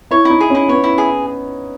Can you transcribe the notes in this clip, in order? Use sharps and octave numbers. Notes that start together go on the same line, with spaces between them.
E4 C#5
D#4 E4
G#4
C#4
E4
B3 C#5
E4
G#4